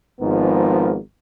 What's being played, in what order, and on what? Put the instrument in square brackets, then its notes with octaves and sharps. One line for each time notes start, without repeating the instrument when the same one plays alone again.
[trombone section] G#1 G#2 F3 B3 A#4